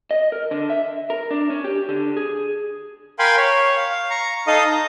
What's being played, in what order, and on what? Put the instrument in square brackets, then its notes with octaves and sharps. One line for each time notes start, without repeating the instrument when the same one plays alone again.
[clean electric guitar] D#5
A#4
D3
E5
A#4
D4
C#4
G4
D3
G#4
[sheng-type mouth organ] A#4 F5 G5 G#5 B5 C6
C#5
F5
A#5 C#6
D#4 A4 D#5 F5 D#6
A#5